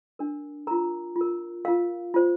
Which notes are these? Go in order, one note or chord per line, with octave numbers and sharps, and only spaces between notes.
D4 A#4
F4 A#4 A#5
F4
A#4
F4 A#4 F5
F4 C5